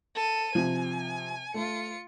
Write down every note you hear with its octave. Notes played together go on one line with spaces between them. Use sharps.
A4 D#7
C3 F3 G#5
A3 F4 C#7